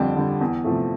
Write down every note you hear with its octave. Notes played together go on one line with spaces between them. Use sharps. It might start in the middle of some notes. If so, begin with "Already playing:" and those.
Already playing: F2 D3 G3 G5 A5
D3 G3
E2
C3 F3 A3